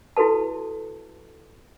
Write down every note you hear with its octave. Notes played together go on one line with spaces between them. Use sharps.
E4 F#4 A4 B4 A5